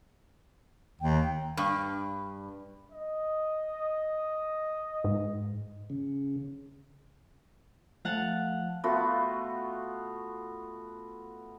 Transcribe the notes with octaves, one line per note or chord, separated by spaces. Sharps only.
D#2 G5
G2
D#5
G#2
C#3
F3 A3 F5 F#5 A5
A3 B3 F4 F#4